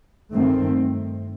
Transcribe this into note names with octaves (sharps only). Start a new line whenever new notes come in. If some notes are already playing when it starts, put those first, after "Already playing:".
G2 D#3 A3 C4